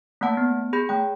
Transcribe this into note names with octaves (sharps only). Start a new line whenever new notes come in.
A3 A#3 F#5 A5
B3
G#4 B5 G6
A3 G5